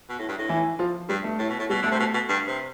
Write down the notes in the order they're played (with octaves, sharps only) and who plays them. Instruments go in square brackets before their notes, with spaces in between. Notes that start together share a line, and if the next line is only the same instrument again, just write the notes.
[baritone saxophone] B2
A2
G2
A2
[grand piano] E3 E4
F3 F4
[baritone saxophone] G2 [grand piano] G3
[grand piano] A3
[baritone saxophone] A2
B2
A2
[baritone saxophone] B2 [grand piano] G3
[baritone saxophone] D3 [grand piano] A3
[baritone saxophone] C3
B2
B2
G2
C3